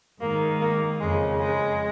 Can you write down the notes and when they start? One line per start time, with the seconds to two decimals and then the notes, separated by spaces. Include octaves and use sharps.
0.20 G#2 D#3 A#3
0.60 A#3
0.99 F2 C#3 G#3
1.39 G#3